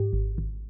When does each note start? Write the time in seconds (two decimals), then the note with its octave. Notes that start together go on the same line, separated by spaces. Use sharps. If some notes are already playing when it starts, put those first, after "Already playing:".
Already playing: G#2 G4
0.13 G#1
0.38 G#1